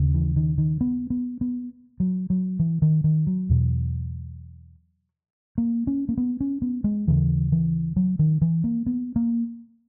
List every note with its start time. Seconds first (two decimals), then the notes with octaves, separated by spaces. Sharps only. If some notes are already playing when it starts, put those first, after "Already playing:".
Already playing: D#2 C#3
0.14 E3
0.36 D#3
0.58 D#3
0.81 B3
1.10 B3
1.41 B3
2.00 F#3
2.30 F#3
2.59 E3
2.82 D#3
3.04 D#3
3.27 F#3
3.49 E2 B2
5.58 A#3
5.87 C#4
6.09 A#3
6.18 B3
6.40 C#4
6.62 B3
6.84 G#3
7.07 D#2 C#3 E3
7.52 E3
7.96 F#3
8.19 D#3
8.42 E3
8.64 A#3
8.86 B3
9.16 A#3